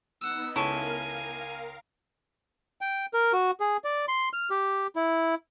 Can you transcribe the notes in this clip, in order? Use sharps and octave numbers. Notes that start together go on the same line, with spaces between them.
B3 D#4 F#5 E6
C#2 E4 A4 A#4 F5 G#5 C#6
G5
A#4
F#4
G#4
D5
C6
F6
G4
E4